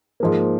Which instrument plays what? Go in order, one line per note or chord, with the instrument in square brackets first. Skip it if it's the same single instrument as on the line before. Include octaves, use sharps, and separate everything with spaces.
[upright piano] G#2 F3 A#3